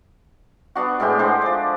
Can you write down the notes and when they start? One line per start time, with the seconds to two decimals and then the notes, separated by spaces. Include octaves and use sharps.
0.75 B3 D4 F#4
1.00 A2 G#3 B3 G4
1.19 G#3 D4 C5
1.42 F3 D5